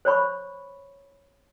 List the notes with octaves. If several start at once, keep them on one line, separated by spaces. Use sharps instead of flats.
C5 C#5 B5 C#6